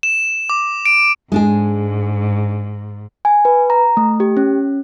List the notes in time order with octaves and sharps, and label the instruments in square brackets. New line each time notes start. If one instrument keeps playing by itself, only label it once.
[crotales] E7
D6
D7
[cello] G#2 [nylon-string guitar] G#3 D4 G#4
[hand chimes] G#5
B4
A#5
A3
G4
C#4